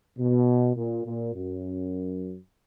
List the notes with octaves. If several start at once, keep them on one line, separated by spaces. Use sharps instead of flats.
B2
A#2
A#2
F#2